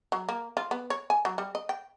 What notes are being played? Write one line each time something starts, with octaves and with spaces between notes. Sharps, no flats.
F#3
A#3
F4
B3
C#5
G#5
F#3
G3
D#5
G5